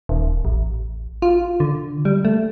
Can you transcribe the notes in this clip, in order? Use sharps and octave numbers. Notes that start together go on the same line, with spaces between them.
D#1
A1
F4
D3
G3
A3